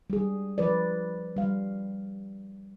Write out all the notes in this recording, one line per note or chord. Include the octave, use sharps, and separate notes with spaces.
G3 G#4
F3 B4 D5
G3 F5